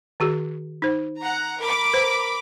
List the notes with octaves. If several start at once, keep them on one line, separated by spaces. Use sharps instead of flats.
D#3 F#4 G#4
D#4 C5
F#5 A#5
A#4 B5 D6
B4 C5